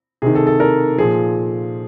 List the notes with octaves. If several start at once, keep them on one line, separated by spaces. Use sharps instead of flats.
C3 D#3 G#4
A4
A4
A#4
A#2 F3 G#4